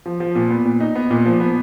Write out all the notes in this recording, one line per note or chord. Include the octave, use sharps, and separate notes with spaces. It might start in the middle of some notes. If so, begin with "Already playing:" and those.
F3
F3
A#2
B3
A#2
D#4
B3
A#2
F3
B3